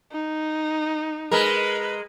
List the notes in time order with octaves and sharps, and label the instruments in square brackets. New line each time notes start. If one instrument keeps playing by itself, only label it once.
[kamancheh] D#4
[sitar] G#3 A#4 [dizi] B4